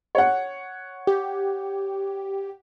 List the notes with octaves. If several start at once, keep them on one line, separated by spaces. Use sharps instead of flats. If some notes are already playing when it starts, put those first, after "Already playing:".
C#5 F#5
G4